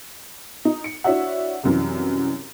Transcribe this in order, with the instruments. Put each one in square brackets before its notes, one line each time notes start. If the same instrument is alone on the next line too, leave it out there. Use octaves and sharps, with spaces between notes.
[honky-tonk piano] D#4
C#7
D4 E4 F#4 C#5 E5 F#5
C2 F#2 E3